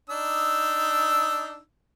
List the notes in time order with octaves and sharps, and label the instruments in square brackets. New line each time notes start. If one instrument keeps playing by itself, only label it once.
[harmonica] D4 D#4 E6